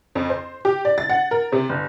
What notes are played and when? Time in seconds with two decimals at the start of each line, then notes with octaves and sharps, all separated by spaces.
0.15 F2
0.30 C5
0.65 G4
0.85 D5
0.98 A6
1.09 F#5
1.31 A#4
1.52 C3
1.69 G1